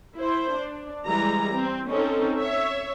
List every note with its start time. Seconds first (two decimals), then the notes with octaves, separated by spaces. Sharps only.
0.17 E4 C5
0.56 D4
1.07 E3 G3 G#3 A#5
1.54 C4
1.88 C4 C#4 D#4 A4
2.37 C#5 E5